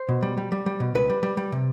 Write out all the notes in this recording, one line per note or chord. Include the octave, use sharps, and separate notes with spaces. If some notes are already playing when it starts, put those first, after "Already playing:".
Already playing: C5
B2
G3
G3
G3
G3
B2
C#2 B4
G3
G3
G3
C3